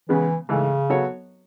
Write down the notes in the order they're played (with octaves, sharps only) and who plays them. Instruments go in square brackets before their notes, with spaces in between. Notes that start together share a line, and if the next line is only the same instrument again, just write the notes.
[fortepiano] C#3 G#3 B3 [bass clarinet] E3
[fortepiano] G#2 E3 A3 [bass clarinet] C#3
[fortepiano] F#3 B3 F#4 A4 C#5